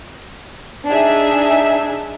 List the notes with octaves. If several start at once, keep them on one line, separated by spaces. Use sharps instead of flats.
D4 D#4 G#4 E5